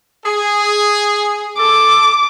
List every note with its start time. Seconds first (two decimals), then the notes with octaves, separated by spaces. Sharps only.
0.24 G#4
1.58 A4 D6